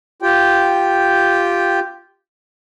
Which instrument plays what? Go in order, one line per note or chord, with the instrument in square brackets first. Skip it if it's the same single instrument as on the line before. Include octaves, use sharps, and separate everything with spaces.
[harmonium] F4 G4 G5